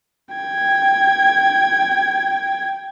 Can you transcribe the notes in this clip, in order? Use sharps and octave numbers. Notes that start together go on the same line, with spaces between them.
G5 G#6